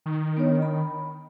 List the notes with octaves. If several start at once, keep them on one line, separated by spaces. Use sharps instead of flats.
D#3
B3 D4 C#5
B5